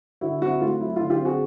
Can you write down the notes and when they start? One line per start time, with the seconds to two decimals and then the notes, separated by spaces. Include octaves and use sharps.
0.21 D3 E4 F#4
0.41 C4 E4 F#4
0.61 A3 F4
0.80 F#3 E4
0.96 D3 F4
1.10 F4 G4
1.20 C4
1.25 F#4 G#4